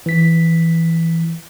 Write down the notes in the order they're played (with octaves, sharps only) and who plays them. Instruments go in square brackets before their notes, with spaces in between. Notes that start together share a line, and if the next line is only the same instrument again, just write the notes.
[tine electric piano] E3 B6